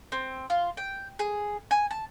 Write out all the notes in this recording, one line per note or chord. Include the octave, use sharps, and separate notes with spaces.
C4
F4
G5
G#4
G#5
A5